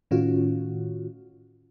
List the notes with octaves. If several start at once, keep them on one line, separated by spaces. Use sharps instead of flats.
A2 D#3 C#4 F4 F#4